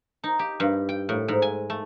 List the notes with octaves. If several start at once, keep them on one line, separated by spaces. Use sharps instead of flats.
D#4
G4
G2
G5
A2
G#2
G#5
A3